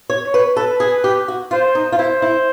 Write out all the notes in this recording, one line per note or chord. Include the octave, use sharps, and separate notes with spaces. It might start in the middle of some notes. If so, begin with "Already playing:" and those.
C#5
C#5
B4
A4 B4
G#4
G4
F#4
F4 C5
D#4
F4
E4 C5
E4